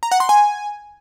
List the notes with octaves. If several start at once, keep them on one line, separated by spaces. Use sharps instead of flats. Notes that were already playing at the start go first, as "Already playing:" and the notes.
A#5
F#5
C6
G#5